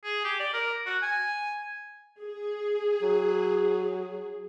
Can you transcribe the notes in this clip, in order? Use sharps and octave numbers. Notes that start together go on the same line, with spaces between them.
G#4
G4
D5
A#4
F#4
G#5
G#4
F#3